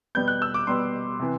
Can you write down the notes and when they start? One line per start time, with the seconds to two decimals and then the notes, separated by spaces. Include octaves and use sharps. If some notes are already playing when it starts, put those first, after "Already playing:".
0.15 B2 G3 B3 G6
0.28 F#6
0.42 E6
0.54 D6
0.67 B2 G3 B3 C6
1.19 C3 E3